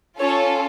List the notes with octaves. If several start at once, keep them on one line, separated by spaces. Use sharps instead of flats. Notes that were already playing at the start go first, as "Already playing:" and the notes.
C#4 F4 A4 C#5